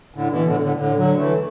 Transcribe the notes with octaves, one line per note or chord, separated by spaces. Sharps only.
A2 D3
B2 E3
A2 D3
A2 D3
A2 D3
D3 F#3
E3 A3